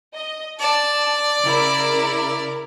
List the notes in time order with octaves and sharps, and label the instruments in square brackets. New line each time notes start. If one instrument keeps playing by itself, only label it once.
[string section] D#5
[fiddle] D5 [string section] A5
[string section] C#3 E4 A#4